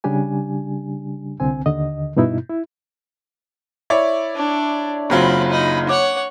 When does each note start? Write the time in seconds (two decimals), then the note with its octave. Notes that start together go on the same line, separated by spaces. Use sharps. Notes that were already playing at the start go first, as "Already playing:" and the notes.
0.04 C#3 G3 D4 G4 G#5
1.40 C2 D3 C4 G#5
1.66 D#2 D3 D#5
2.16 G2 B2 D#4 E4
2.49 E4
3.90 E4 C#5 D5
4.35 D4
5.10 F#1 F#3 C4 F4 B5
5.50 D#4 B5
5.89 C#5 F#5 D6